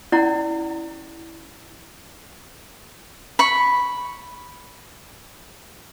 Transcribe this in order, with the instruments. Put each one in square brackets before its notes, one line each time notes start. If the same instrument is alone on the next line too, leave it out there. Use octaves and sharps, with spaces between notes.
[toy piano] C#4 E4 D5 F#5 A#5
[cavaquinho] B5 C#6